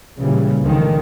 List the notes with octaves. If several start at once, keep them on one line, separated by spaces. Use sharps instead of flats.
A#2 C#3 E3 G3
C#2 D3 D#3 F3 G#3